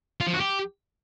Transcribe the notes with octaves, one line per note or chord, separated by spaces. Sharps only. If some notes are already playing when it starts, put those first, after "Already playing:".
F4
F3
F#4
G4